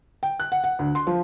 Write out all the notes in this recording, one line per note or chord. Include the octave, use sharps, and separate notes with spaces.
G5
F#6
F#5
F#5
D2
C6
F3